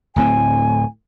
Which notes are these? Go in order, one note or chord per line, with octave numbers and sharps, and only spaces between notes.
D1 A2 C4 G#5